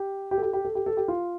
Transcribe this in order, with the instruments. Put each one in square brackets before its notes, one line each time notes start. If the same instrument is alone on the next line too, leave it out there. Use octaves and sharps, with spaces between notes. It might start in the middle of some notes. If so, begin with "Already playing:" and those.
Already playing: [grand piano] G4
G4
A4
G4
G4
A4
G4
A4
G4
F4